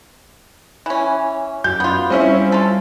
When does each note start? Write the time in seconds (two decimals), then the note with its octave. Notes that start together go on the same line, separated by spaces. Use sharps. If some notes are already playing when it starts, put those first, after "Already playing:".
0.86 E3 C#4
1.64 F#2 G4 G6
1.80 B3 F4
2.10 G3 C4 C#4 E4
2.52 F4 A4